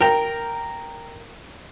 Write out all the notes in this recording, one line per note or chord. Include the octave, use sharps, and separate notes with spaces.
A#4 G5 A#5